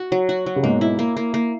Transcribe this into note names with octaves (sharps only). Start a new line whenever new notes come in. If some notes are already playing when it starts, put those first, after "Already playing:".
Already playing: F#4
F#3
F#4
F#3
C#3
G#2 B2 A#3
E4
A#3
A#3
A#3